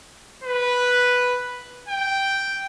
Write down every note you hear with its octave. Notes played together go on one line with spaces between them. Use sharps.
B4
G5